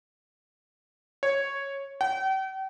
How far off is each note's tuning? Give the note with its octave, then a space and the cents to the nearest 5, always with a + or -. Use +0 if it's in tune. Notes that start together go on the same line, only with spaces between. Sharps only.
C#5 -5
G5 -40